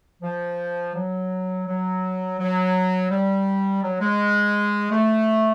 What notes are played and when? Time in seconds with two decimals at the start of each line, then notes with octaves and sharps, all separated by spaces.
0.22 F3
0.95 F#3
1.67 F#3
2.39 F#3
3.10 G3
3.83 F#3
4.01 G#3
4.91 A3